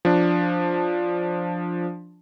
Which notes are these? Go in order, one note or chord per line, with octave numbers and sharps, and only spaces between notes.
F3 D4